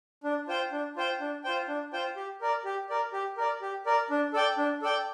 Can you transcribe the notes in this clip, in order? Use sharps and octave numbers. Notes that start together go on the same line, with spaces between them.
D4
F4 C5 G5
D4
F4 C5 G5
D4
F4 C5 G5
D4
F4 C5 G5
G4
A#4 D5
G4
A#4 D5
G4
A#4 D5
G4
A#4 D5
D4
A4 D5 G5
D4
A4 D5 G5